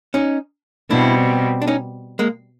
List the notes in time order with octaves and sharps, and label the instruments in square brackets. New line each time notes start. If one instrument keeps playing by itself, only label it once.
[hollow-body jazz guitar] C#4 D#4
[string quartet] B2 G3 C4 [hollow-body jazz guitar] D4 E4
[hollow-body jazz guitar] D4
C#4 D#4
G#3 A#3